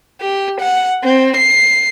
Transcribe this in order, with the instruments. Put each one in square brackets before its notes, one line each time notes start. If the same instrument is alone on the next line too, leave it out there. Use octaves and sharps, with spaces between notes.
[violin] G4
F#5
C4
C7